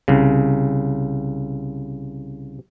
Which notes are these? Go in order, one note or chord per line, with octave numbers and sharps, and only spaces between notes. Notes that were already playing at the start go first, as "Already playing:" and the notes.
C2 C#3